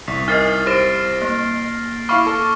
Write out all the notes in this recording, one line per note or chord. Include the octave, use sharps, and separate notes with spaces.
C2 B6
D#4 A#4 D#5 F6 A6 C7
G4 C5 A#6 D7 E7
A#3
E4 F5 B5 C#6 D6 F6
A4